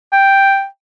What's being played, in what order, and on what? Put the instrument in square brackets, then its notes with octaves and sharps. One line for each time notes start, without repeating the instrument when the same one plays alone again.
[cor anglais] G5